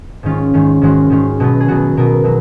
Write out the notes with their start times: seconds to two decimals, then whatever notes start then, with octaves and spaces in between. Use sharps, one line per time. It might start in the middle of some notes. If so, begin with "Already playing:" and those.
0.23 G#2 D#3 G#3 C#4 F4
0.54 G#2 D#3 G#3 C#4
0.82 G#2 D#3 G#3 C#4 F#4
1.10 G#2 D#3 G#3 C#4
1.40 B2 F#3 B3
1.60 G#4
1.68 B2 F#3 B3 F#4
1.97 B2 F#3 B3 A#4
2.24 B2 F#3